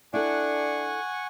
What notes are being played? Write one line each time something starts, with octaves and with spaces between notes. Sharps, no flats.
D4 E4 A4 F#5 G#5 C#6